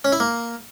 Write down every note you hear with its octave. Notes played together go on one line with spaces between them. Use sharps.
C#4
E4
A#3